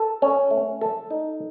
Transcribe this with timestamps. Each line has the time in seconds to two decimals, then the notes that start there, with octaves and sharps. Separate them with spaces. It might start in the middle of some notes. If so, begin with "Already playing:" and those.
Already playing: A4
0.22 C#4
0.51 A3
0.81 A4
1.10 D#4